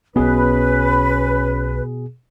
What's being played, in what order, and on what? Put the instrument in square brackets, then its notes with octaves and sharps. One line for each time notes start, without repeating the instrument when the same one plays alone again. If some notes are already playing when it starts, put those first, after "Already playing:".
[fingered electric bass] B1 B3 [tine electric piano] B2 G#4 [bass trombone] C#4 [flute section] B4